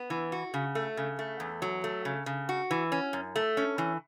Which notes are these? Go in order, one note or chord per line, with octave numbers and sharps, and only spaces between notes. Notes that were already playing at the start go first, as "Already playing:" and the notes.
Already playing: B3
E3
F#4
C#3
A3
C#3
A3
E2
F#3
A3
C#3
C#3
F#4
E3
C#4
F#2
A3
C#4
E3